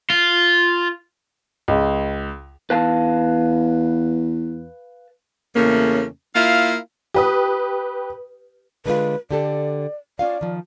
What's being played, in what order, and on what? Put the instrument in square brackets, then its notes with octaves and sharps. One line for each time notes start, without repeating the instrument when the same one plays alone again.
[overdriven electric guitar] F4
[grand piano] C#2
[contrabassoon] E2 [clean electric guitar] B4 F5 A5
[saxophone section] E2 C#3 A3 A#3 C#4
A#3 E4 F4 F5
[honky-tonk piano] G4 B4 D#6
[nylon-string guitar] D3 G#3 F4 [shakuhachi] B4
[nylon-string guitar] D3 G4 A4 [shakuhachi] D5
[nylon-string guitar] C#4 F4 F5 [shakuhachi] D5
[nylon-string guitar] D#3 F3